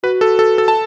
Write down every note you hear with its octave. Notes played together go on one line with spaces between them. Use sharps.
F#4 B4
A4
A4
A4
A5